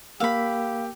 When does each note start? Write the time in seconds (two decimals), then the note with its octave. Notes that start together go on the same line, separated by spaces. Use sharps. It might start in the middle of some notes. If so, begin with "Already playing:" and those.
0.20 A#3 G4 A#4 F5 B5 E6